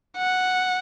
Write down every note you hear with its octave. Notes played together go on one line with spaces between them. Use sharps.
F#5